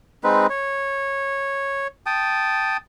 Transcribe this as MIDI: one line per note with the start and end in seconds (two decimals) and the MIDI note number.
0.24 0.47 56
0.24 0.47 60
0.24 0.47 63
0.24 0.47 71
0.50 1.87 73
2.06 2.77 79
2.06 2.77 81
2.06 2.77 87